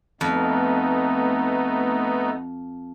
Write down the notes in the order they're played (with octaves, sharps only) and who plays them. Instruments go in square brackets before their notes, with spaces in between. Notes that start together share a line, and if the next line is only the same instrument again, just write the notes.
[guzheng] F2 [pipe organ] A3 B3 D#4